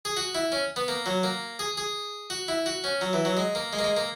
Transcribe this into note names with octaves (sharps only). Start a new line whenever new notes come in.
G#4
F#4
E4
C#4
B3
A#3
F#3
A#3
G#4
G#4
F#4
E4
F#4
C#4
F#3
E3
F#3
G#3
A#3
G#3
A#3
G#3
A#3